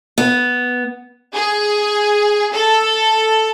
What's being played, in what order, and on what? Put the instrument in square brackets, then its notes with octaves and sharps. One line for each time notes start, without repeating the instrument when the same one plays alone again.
[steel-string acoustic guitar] B3
[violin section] G#4
A4